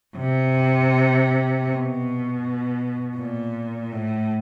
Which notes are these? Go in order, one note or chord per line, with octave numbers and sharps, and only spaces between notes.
C3
B2
A#2
A2